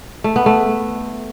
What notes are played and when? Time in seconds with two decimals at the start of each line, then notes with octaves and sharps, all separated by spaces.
0.24 A3
0.36 B3
0.46 A3